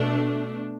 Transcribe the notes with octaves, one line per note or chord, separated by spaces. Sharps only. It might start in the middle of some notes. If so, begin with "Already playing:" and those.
Already playing: B2 A3 D4